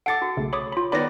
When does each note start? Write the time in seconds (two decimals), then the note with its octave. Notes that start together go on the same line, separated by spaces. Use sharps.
0.06 A4 F#5 D6 A6 C#7 D7
0.22 F#4
0.37 B1 C#3 A3
0.53 C#5 B5 D6 D#6
0.72 F4 B5
0.92 D#3 B3 D5 B5 A#6